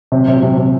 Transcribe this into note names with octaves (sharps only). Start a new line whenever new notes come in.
C3
C3
C3
C3